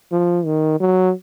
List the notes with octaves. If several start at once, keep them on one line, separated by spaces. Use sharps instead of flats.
F3
D#3
F#3